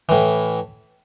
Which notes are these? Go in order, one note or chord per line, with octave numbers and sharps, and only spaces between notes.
A2 E3